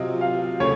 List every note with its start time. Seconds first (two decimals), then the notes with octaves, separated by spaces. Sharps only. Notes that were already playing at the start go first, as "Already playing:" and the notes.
Already playing: C3 F#3 C4 F4 D#5
0.21 F5
0.60 C#3 A3 C#4 C#5